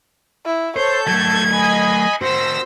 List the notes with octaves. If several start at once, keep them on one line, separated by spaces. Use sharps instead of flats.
E4
A4 C5 C#5 G6
F#3 A3 G#6
D#5 G#5 B5
C4 F#4 C5 E6 A#6